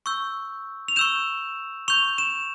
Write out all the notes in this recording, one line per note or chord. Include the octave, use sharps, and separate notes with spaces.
C#6 E6 G6
F7
C#6 E6 G6 E7
C#6 G6 F7
E7